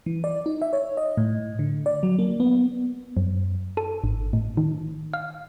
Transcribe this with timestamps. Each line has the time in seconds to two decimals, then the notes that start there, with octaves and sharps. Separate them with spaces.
0.06 E3
0.24 D5
0.46 D#4
0.62 E5
0.73 C#5
0.97 D#5
1.17 A2
1.59 D3
1.86 D5
2.03 F#3
2.19 A#3
2.40 B3
3.17 F#2
3.77 A4
4.04 G#1
4.33 A2
4.57 D#3
5.13 F5